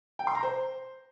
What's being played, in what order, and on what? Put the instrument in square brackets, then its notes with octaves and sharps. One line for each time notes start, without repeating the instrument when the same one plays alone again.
[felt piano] G5
C6
A#5
C5